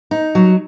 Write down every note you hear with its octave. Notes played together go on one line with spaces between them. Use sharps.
D#4
F#3